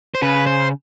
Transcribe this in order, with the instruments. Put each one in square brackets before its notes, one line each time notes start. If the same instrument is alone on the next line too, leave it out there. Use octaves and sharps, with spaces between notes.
[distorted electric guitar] C5
[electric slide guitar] C#3 [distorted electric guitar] B4
[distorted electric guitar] C5